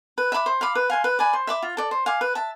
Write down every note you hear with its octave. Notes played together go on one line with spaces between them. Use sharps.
B4
E5 B5 D6
C5
F5 B5 D6
B4
F5 G#5 C6
B4
D5 G#5 B5
C5
E5 B5 D6
F4
A4 D5
C5
F5 G#5 D6
B4
E5 A5